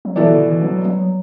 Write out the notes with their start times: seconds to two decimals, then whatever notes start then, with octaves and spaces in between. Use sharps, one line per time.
0.05 F#3
0.16 B2 E3 B3 E4 A4 D5
0.31 D3
0.46 E3
0.62 F#3
0.85 F#3